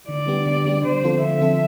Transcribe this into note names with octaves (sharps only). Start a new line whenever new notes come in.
D3 D5
G3 B3 D4 G4
D3
G3 B3 D4 G4
D3 C5
F3 C4 F4 A4
D3 E5
F3 C4 F4 A4